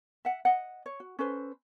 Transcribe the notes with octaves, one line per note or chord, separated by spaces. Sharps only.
E5 F#5
D#5 F#5
C#5
F#4
C#4 A4 B4 C5